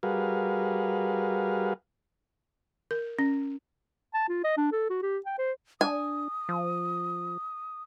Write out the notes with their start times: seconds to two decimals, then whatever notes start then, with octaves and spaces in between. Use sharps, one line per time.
0.03 G3 F#4 G#4 A#4 B4 F5
2.91 A#4
3.19 C#4
4.14 A5
4.29 F4
4.44 D#5
4.57 D4
4.72 A4
4.90 F#4
5.02 G4
5.26 G5
5.38 C5
5.81 D4 G#5 D#6
6.49 F3